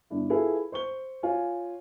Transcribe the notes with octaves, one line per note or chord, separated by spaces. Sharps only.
G1 D4 E4
E4 F4 G#4 A4 B4
C5 C#6 G7
F4 C#5 F5 G#5